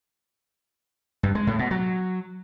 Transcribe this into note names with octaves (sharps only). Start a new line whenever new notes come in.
G2
G#3
A2
B2
F#3